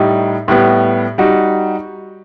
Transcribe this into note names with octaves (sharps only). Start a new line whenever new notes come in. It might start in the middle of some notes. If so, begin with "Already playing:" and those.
Already playing: A2 G3 D#4
A2 G3 B3
G3 D#4 F#4